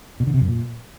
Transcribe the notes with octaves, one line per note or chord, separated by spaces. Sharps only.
B2
D3
C3
F#2
A#2